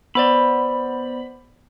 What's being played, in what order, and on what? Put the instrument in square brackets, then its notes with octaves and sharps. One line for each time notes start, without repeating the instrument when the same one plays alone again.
[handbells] B3 C5 D5 [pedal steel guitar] B5